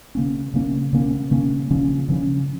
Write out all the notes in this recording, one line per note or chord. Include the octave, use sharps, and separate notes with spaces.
C#3 A#3 C#4
C#3 A#3 C#4
C#3 A#3 C#4
C#3 A#3 C#4
C#3 F3 C#4
C#3 F3 C#4